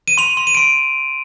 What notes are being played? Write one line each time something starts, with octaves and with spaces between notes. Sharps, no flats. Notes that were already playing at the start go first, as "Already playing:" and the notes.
D#7
C6 F7
C6
D#7
C6 D7